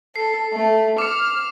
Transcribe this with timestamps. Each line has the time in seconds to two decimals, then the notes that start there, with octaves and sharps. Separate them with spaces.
0.16 A4 C7
0.52 A3
0.98 D6 F6 C#7